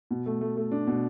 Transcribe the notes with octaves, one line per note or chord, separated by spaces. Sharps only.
B2
A3
A3
A3
D4
B2